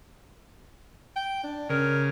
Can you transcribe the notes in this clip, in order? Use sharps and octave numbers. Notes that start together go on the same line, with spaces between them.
G5
D4
C#3 A#4